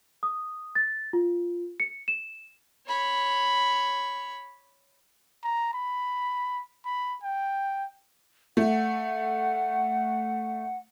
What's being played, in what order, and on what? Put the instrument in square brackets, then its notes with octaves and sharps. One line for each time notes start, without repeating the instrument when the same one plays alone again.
[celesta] D#6
A6
F4
C#7
E7
[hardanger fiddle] C#5 B5
[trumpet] A#5
B5
B5
G5
[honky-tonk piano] A3 [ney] F#5